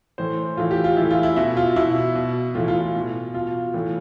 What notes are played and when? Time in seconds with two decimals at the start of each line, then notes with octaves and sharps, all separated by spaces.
0.18 A2 E3 C5
0.57 A2 E3 F4
0.71 G4
0.84 F4
0.97 A2 E3 E4
1.10 F4
1.23 E4
1.36 B2 E4
1.57 F4
1.76 B2 E4
2.15 B2
2.55 A2 E3 F4
2.68 F4
2.81 F4
2.95 B2
3.34 B2 F4
3.74 A2 E3